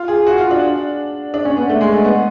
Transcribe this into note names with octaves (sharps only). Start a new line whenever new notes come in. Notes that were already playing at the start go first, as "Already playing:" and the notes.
Already playing: F4
G#4
F#4
F4
D4
D4
C#4
B3
A3
G#3
A3
B3